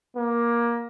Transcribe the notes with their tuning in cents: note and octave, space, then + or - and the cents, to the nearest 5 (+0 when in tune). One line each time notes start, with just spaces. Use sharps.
A#3 +15